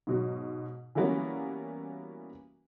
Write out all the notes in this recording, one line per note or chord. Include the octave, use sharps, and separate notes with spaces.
G#2 B2 F#3
E3 F#3 G3 A#3 B3 C#4